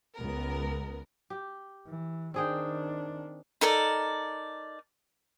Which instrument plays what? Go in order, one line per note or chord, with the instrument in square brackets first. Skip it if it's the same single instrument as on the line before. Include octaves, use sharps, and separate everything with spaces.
[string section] C#2 B3 A#4
[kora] G4
[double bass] E3
[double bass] D#3 D4 [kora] C4 G#4 G5
[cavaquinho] D#4 A4 A#4 D5